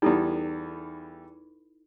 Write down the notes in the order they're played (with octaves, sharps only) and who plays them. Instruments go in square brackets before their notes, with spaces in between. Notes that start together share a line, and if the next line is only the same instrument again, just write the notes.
[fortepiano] E2 G3 [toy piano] D#4 E4 A4